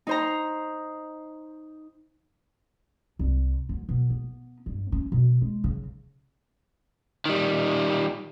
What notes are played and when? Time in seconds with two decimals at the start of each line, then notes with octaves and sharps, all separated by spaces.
0.07 D#4 C5 A#5
3.19 C2
3.69 D2
3.89 B2
4.10 B3
4.66 G2
4.92 C#4
5.12 B2
5.41 G#3
5.64 C#3
7.26 D#3 G3